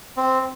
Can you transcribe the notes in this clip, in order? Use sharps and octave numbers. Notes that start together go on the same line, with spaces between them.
C4